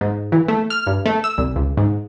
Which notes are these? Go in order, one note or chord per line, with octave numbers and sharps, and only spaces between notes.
G#2
E3
A3
F6
G2
A3
E6
C2
C#2
G#2